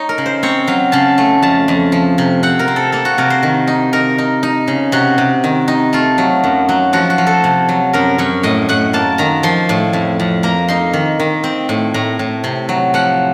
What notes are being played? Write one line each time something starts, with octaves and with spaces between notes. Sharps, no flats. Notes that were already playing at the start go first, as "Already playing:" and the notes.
Already playing: D#4 C#5
A#4
C#3
C5
C4 C#5
F#3 F5
C#3 A5
A3
F2 A5
F2
F3
C3
C4 F#5
A#4
C4
A4
A#3 A4
F#4
C3 A#4
C5
D#3
D#4
D#4 A#4
D#4
D#4
C#3
C3 F#4
C3
D#3
D#4
A3 F4
F#3
F#2
F#3
F3 F#4
F#4
F3
A4
C3
F#3
F#2 A#4
F#2 C#5
A2 D#5
A2 F#5
A#3 A5
D#3 A#5
F3 C6
A2
F2
F2
A#3 A#5
D#4 C6
D#3
D#3
C4
A2
A2 A#5
A2
C3
F#3
F3 F#5